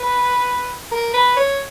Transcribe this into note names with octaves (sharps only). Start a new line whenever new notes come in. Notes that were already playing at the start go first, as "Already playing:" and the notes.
Already playing: B4
A#4
B4
C#5